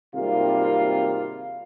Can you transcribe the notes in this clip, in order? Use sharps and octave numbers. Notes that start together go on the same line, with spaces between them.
G#1 C3 G3 A#3 F4